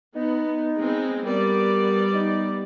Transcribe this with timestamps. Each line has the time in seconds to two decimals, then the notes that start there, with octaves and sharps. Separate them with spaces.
0.15 B3 D#4
0.76 G#3 B3 C4
1.24 G3 B3 A#4 D5
2.14 D#4